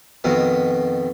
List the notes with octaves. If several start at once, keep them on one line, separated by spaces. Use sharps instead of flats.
F2 B2 D#3